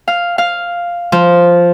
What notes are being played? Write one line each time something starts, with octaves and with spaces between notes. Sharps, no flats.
F5
F5
F3